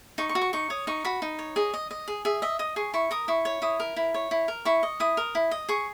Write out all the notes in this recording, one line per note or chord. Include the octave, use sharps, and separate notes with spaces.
D#4 C#6
C#6
F#4
C#6
D#4 C#6
C#5 D#6
D#4 C#6
F#4 B5
D#4
C#5
G#4 D#5
D#5
D#5
G#4
G#4 E5
D#5 E5
D#5 D#6
G#4 C#6
E4 C#6
A#4 D#6
E4 C#6
C#5
E4 D#6
A#4
E4
C#5
E4
A#4
E4 C#6
D#5
E4 D#6
A#4
E4
D#5
G#4 C#6